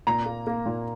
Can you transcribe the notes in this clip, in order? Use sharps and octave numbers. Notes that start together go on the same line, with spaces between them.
A#2 A#5
A#3
A#3
A#2